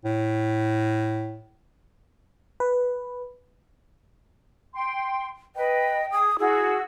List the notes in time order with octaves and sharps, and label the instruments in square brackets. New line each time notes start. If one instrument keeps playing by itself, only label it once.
[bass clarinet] A2
[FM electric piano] B4
[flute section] G5 C6
[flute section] B4 [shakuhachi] D#5 [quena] G5
[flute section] G#4 [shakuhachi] D#6
[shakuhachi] E4 [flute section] F#4 E6 [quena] G#4